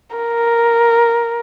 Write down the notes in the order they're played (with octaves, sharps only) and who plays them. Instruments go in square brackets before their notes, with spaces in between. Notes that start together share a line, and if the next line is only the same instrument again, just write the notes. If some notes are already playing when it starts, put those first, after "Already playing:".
[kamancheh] A#4